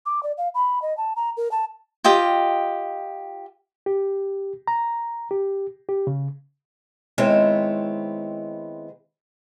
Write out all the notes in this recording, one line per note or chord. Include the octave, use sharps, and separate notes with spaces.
D6
D5
F5
B5
D#5
A5
A#5
A#4
A5
F4 G4 D#5 G5
G4
A#5
G4
G4
C#3
D#3 G#3 B3 C4 E4 C#5